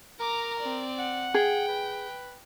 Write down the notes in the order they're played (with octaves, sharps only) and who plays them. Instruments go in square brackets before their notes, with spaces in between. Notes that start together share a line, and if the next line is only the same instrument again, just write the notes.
[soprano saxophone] A#4 [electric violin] A#5 D6
[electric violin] C4 D5
[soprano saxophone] F#5
[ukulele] G#4 [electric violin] G5
[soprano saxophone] B4